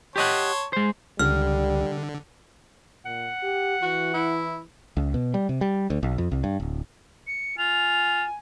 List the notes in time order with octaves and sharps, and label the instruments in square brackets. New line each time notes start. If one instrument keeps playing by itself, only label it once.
[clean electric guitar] G4 D#5 F#5 [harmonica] C#5 A5 C6
[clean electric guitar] G#3 C5
[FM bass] C#2 [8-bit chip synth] D3 [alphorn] G3 [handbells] F6
[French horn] A#2 [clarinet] F#5
[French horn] G4
[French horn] E3 [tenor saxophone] F#4
[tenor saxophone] E4
[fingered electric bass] C#2
B2
G3
C3
G3
D2
B1
F2
C2
G2
D1
[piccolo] C#7
[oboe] F4 [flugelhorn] G#5 [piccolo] F7